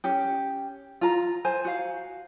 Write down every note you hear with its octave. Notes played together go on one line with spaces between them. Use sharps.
C#4 G4
F4 A#5
C5 G#5
F#4 F5